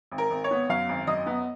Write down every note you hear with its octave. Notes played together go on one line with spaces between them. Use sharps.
G#1
A#4
G#1
C#5
B3
F#2 F5
G#1
F#2 D#5
B3